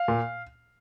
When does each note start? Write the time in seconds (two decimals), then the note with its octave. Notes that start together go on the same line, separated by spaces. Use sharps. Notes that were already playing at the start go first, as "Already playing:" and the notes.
Already playing: F5
0.08 A#2